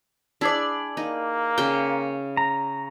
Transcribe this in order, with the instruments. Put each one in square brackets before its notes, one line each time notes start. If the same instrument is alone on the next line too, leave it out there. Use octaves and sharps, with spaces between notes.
[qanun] D4 [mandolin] E4 G#4 D5
[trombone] A#3 [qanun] D#4
[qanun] C#3 G5
[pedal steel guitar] A#5